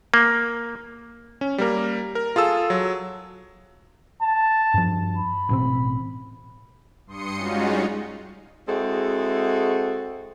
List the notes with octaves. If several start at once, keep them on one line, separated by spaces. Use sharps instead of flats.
A#3
C#4
G3 A#3 A#4
A#4
F4 G#4 A4 E6
F#3
A5
G2 F3
B5
A1 B2 C4
G2 C6 D#6 C#7
G3 G#3 C#4 D#4 F4 F#4
G#3 C4 E4 F#4 G#4 A4